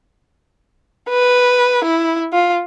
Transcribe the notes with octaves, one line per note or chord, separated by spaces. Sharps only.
B4
E4
F4